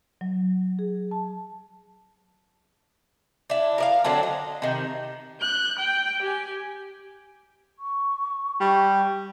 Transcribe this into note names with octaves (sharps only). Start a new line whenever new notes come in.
F#3
G#4
A5
D4 E4
A#4 D5 F5
D3 F#3 C4 D4
D#5
C3 D#3
F#6 G6
G5
G4 G#5
C#6
G3